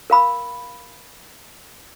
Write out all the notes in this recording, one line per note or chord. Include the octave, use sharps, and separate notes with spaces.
A#4 F5 B5 E6